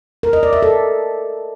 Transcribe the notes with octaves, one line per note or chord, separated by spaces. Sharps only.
A#4
D#5
D5
E5
A4